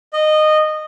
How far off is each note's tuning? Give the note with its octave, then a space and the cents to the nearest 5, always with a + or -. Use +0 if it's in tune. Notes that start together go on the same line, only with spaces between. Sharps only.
D#5 -15